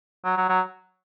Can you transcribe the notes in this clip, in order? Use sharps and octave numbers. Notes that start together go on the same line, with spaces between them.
F#3
F#3
F#3